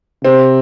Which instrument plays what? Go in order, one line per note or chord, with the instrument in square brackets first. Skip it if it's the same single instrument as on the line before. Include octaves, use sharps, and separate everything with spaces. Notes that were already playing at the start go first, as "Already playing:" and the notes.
[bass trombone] C3 [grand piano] C4